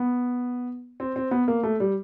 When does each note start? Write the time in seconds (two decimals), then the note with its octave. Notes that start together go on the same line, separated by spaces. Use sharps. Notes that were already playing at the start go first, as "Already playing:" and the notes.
Already playing: B3
1.00 C4
1.16 C4
1.31 B3
1.48 A#3
1.63 A3
1.80 G3